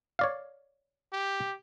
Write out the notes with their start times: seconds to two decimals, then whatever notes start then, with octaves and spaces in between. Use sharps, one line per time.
0.19 C#5 D5 F5
1.13 G4